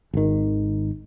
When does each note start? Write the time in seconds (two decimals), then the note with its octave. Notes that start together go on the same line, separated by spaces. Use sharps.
0.14 G#1 D#3